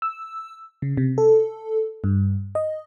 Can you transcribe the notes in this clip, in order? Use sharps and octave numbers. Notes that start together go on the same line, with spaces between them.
E6
C#3
C3
A4
G2
D#5